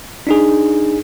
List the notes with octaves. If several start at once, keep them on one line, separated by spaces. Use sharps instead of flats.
D4 D#4 G#4